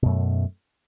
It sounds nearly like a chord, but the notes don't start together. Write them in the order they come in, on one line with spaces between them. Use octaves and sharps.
B2 F#2 A3